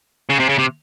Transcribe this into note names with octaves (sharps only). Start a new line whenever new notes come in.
C#3
C3
C#3
C3